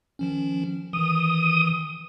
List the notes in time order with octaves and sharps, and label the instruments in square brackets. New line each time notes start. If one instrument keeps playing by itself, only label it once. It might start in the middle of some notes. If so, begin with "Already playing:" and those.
[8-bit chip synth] D#3 F3 C#4
[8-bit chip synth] D#3 E3 [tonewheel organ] D#6